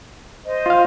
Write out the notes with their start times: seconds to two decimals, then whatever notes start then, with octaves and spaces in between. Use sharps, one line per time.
0.45 C5 D#5
0.66 F4 F5